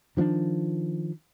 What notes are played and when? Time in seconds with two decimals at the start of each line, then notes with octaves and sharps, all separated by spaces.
0.17 D#3 F3 A3 D4